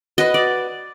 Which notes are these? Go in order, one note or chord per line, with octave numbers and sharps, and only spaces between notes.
F#4 B4 D#5
D5